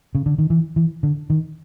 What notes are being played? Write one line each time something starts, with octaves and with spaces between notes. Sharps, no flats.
C#3
D3
D#3
E3
E3
D3
D#3